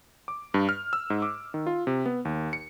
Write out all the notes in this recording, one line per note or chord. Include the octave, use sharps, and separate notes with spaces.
D6
G2
F6
E6
G#2
D6
D#3
F4
C3
B3
D#2
C#7